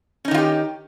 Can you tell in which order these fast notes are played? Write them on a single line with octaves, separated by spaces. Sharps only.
C#4 D#4 D#3 F4 G4